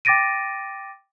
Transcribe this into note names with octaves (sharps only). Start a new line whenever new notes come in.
G5 D6 A6 A#6 D7 D#7